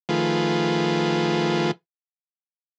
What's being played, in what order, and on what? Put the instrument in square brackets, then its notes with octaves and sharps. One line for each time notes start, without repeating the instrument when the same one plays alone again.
[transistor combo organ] D#3 F3 A3 F4 G#4 B4